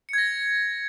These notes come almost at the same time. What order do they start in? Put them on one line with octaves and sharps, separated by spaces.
C#7 G#6 A#6